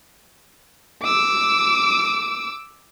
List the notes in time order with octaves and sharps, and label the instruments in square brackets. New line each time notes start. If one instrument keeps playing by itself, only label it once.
[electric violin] D6 E6